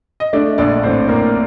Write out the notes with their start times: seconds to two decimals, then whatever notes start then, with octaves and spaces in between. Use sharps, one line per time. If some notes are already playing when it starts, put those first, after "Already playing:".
0.20 D#5
0.33 A3 D4 D5
0.58 A#1 D4 D5
0.83 A2 C4 C5
1.09 A#1 A#3 A#4